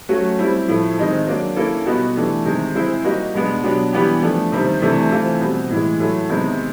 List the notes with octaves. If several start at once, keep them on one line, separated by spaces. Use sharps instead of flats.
F#3 A3 C#4 F#4
G3 C4 E4
A2 F3 A3
D#3 G#3 C4 D#4 G#4
F#3 A#3 D4
A#3 C#4 E4 A4
B2 G3 B3 D#4 F#4
E3 A3 D4 G4
C3 D#3 G#3
G#3 C4 E4 G#4 C5
G3 A#3 D#4 F#4
B2 G#3 B3 D4
B2 F#3 B3 D4 G4
E3 G3 B3 D4 G4
F3 A3 D4
C3 D#3 G3 C4
C3 E3 A3 D4
E3 A3 C4 F4
B2 G3 C4
A2 E3 G#3
A2 F#3 A3
C3 D#3 G#3 B3